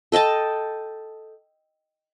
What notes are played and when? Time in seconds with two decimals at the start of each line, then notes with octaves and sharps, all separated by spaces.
0.12 A4 D#5 G5 A5